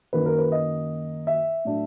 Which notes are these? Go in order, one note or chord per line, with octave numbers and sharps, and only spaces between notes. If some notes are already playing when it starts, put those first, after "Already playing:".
F#2 D#3 F#3 A#3 B4
A#4
B4
D#5
E5
A2 F#3 A3 D4